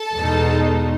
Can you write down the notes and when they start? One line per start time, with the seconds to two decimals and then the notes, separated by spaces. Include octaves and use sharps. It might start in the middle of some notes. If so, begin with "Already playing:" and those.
Already playing: A4 A5
0.15 E2 B2 G#3 D#4